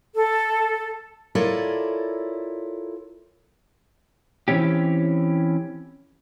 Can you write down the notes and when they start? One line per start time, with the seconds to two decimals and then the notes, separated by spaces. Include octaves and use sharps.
0.14 A4
1.35 E4 F4 A4 A#4 C#5 D5
4.48 E3 C4 C#4 G4